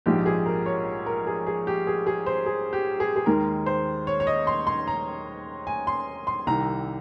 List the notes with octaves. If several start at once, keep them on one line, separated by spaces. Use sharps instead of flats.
A#1 G#2 F3 G#3 G4
G#4
A#4
C#5
A#4
G#4
G#4
G4
G#4
G#4
C5
G#4
G4
G#4
G#4
D#2 D#3 G#3 A#4
C5
C#5
C#5
D#5
C6
C6
A#5
G#5
C6
C6
C2 C3 D#3 A#5